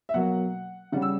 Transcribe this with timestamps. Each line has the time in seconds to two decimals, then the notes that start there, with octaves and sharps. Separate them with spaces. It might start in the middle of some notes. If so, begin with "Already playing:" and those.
0.09 E5
0.14 B2 F#3 A#3 F#5
0.92 C#3 G3 C#4 F#5
1.02 E6